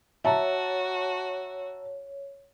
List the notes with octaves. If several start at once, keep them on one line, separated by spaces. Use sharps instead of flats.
F#4 C#5 E5 A5 A#5